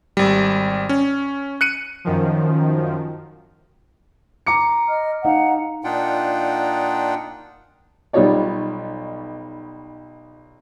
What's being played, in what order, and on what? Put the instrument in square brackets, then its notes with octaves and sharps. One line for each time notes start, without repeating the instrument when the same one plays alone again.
[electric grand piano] G#1 G3
C#4
F#6 C#7 D#7
[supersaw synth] F#2 D#3 F3
[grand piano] A#5 D6 C#7
[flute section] D#5 F6
[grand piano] D#4 [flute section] F5 F#5 A#5
[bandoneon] A#2 D4 D#4 F4 F#5 G5
[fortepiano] B1 G3 D#4 F4 C#5 D5